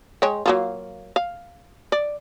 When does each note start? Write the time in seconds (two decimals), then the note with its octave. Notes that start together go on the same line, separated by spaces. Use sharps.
0.22 G#3 C#5 G5
0.46 F#3 A#3 F4
1.16 F5
1.92 D5